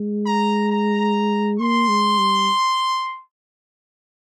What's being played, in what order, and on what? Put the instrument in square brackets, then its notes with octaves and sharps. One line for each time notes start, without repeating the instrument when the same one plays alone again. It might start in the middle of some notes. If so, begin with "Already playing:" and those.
Already playing: [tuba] G#3
[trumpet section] A#5
A#5
[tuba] A#3 [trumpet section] C6
[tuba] G#3
G3